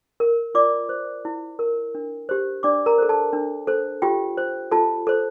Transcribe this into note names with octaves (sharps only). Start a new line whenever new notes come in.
A#4
F4 D5 D6
C5
E4
A#4
D4
G4 C5
D4 D5 D6
A#4 A#5
A4 C5
A4 A5
D4
A4 C5
F4 G4 G5
C5
F4 A4 A5
A4 C5